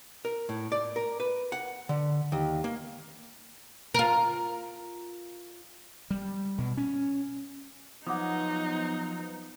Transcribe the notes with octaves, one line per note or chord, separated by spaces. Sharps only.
A#4
A2
D5
A#4
B4
F#5
D3
D#2
A#3
F4 A#4
G3
B2
C#4
F3 F#3 B3 D#4 F#5 D6 D#6